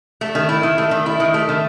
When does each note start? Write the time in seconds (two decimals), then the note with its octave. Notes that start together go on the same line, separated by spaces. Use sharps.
0.21 A3
0.35 D#3
0.49 E4
0.63 D#3
0.78 A3
0.91 D#3
1.06 E4
1.20 D#3
1.34 A3
1.49 D#3